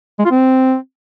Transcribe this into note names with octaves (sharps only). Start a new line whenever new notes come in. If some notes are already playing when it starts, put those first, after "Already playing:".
G#3
F4
C4